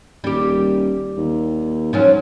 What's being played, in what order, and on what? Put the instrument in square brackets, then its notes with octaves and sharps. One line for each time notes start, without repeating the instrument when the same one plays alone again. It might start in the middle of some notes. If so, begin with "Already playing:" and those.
[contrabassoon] D#1 [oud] G3 G4
[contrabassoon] D#2
[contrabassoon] G#2 [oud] F3 F#3 C#4